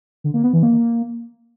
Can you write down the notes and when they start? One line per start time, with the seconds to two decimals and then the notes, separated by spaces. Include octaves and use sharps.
0.24 D3
0.34 A#3
0.44 B3
0.53 E3
0.63 A#3